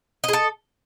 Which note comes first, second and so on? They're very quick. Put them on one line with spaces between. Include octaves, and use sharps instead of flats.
D#5 G#4 A4